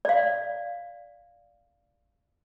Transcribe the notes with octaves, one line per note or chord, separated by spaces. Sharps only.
D5 F5